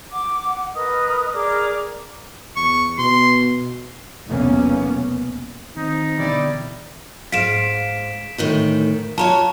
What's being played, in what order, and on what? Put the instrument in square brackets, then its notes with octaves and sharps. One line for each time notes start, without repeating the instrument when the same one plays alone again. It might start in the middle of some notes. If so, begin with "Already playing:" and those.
[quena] F#5 [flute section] D6
[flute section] A#4 B4 D#5 [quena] D#6
[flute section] G#4 A#4 D6 [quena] D5
[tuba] E2 [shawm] C#6
[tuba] B2 [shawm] C6
[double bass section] F1 B1 E2 A#3 B3 C#4
[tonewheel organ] D#3 C4 [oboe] D#4
[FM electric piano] B2 D3 E3 [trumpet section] G3 E4 D5
[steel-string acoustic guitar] G#2 F5 [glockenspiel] B6 D7 E7
[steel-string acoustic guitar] D2 A2 D#3
[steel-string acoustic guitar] F4 F#4 C#5 [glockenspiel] A5 A#5